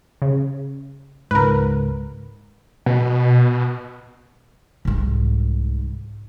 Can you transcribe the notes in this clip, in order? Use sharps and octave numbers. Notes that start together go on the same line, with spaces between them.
C#3
C#2 G#2 A#4 B4
B2
C2 G#2